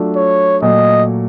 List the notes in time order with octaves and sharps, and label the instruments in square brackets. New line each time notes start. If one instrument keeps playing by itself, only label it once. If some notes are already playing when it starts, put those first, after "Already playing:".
Already playing: [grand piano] F#3 A3 D4 F4
[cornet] C#5
[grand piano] A#2 F#3 A3 [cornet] D#5